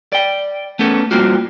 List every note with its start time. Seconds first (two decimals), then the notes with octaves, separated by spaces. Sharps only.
0.12 D5 G5
0.79 A3 B3 C#4 A4
1.11 G3 A#3 C4 F4 F#4